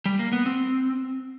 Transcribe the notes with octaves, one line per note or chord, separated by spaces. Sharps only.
G3
A#3
B3
C4